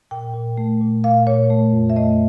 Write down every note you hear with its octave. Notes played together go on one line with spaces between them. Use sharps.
A#2 G5
A#2
A3
A#2
A#2 F5
A#2 C#5
A3
F2
E5
A3 D#5